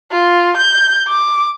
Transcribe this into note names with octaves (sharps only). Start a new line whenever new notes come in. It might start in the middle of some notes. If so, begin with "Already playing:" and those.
F4
G6
D6